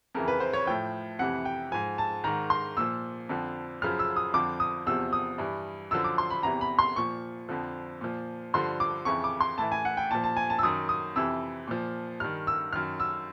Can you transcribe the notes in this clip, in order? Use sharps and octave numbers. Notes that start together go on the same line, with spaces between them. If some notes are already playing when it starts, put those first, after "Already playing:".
F2 C#3 E3 A#4
B4
C5
C#5
A2 F3 G5
F2 C3 E3 F#5
G5
G#2 F3 G#5
A5
G#2 D#3 A#5
C6
A#2 F3 E6
F2 D3 F3
F#2 C#3 F3 F6
E6
D#6
F2 D3 F3 D6
D#6
E2 C3 F3 E6
D#6
G2 E3
F#2 D3 F3 E6
D6
C6
B5
E2 C3 E3 A#5
B5
C6
A#2 F3 C#6
F2 D3 F3
A#2 F3
G2 D3 F3 C6
D6
F2 C#3 E3 C#6
D6
C6
A2 E3 A5
G#5
F#5
G5
A#2 F3 A5
A5
G#5
A5
E6
F#2 D#3 D#6
D#6
F2 C3 E3 E6
A#2 F3
G2 D#3 F6
E6
F#2 D#3 F6
E6